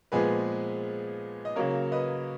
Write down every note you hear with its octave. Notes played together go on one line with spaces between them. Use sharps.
A#2 F3 G#3 B3 G#4 B4
D#5
C#3 F#3 A#3 A#4 C#5
B4 D#5